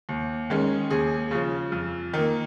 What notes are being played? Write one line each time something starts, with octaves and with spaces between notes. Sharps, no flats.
D#2
D#3 G#3 C#4
D#2 G#4
C#3 F3
F2
D#3 A#3